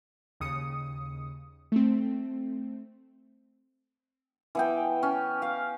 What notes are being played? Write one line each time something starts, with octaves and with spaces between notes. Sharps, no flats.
D#2 C#3 D#6 C#7
A3 C4
E3 B3 G5
C#4
F5